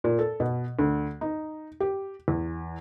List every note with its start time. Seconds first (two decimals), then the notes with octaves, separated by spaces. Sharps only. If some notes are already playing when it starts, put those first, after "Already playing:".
0.04 A#2
0.19 A4
0.40 B2
0.79 D2
1.21 D#4
1.80 G4
2.28 E2